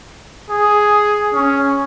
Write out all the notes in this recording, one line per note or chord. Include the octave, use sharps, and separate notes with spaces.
G#4
C#4